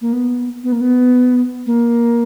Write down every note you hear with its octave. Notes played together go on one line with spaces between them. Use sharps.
A#3
B3
B3
A#3
B3
A#3